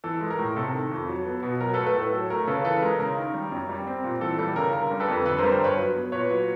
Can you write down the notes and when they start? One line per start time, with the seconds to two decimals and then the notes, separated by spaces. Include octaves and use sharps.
0.04 E3 A4
0.21 G#3
0.30 A#4
0.38 A2
0.56 C3 A4
0.74 D#3
0.91 F2
1.09 F#3
1.25 B3
1.42 B2
1.61 F#3 A#4
1.74 A4 B4
1.78 A3
1.86 A4 B4
1.96 A2
2.12 F#3 A4
2.30 A3 A#4
2.47 C#3 A4 B4
2.65 E3 A4 B4
2.82 G#3 A#4
2.99 C#3 A#4
3.17 D#3
3.34 G3
3.52 F#2
3.69 G3
3.87 C4
4.04 A#2
4.21 E3 A4
4.39 G3 A4
4.56 C#3 A#4
4.73 D3 A#4
4.91 G3
5.00 A4 B4
5.08 F2
5.26 D3 A4 B4
5.38 A#4 C5
5.43 G3
5.51 A#4 C5
5.61 G2 B4 C#5
5.78 F#3
5.95 B3
6.12 A#2 B4 C#5
6.30 F#3